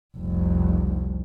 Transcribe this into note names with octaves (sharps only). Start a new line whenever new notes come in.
F1 C2